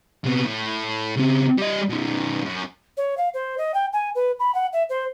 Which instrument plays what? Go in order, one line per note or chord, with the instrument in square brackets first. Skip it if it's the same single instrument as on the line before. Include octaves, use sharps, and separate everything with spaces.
[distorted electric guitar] C3 B3
A2
C#3 C4
G3 D#5
B2 D#3
F#2
[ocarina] C#5
F5
C5
D#5
G5
G#5
B4
B5
F#5
E5
C5